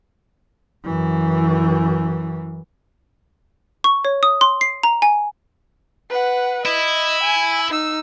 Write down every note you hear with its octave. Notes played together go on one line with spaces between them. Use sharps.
F#2 E3
C#6
C#5
D#6
C6
C7
A#5
G#5
B4 F#5
E4 D#5
G#5
D#4 E6